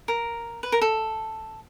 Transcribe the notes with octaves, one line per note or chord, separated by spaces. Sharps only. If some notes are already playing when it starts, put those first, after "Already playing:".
A#4
B4
A#4
A4